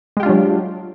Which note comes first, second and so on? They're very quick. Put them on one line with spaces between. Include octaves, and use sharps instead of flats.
G#3 G4 F4 D4 F#3